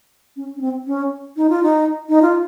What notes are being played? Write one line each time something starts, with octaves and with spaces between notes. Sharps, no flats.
C#4
C#4
C4
C#4
D#4
F4
D#4
D#4
F4